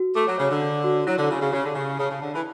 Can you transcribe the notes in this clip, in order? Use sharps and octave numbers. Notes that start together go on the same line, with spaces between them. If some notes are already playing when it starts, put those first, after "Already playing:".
Already playing: F#4
A3 D6
F#3
C#3 C#5
D3
D4
F#4
F#3 E4
D3
C#3 E4
C#3
C#3 G4
D3
C#3 G4
C#3 A5
C#3
D3 A5
E3